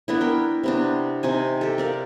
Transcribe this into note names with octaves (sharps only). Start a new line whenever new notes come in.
B3 D4 E4
A#4 G5
C3 B3 D4
C3 D#4 G#5
G4 A4
A#4 D5 F5